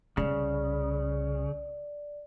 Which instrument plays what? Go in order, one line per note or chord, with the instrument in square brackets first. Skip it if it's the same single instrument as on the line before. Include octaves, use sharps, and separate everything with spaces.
[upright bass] C2 C#4 [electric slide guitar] C#3 [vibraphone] D5